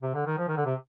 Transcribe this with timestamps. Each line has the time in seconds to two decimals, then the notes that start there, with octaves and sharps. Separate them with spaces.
0.02 C3
0.15 D3
0.26 D#3
0.38 F3
0.48 D#3
0.57 D3
0.66 C3